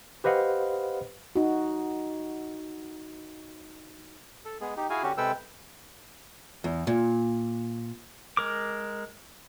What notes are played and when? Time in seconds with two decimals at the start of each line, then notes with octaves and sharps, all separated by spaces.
0.24 G4 B4 C5 D#5 F5 F#5
1.36 D#4 F#4
4.45 A4
4.61 G#3 B3 G#4
4.77 D#4 G4
4.90 E4 F#4 G#4 F5 G#5
5.03 D3 C#4 F#4 G4
5.18 C3 G#3 A4 B4 G5 E6
6.64 E2
6.87 A#2
8.37 G#3 A#4 D6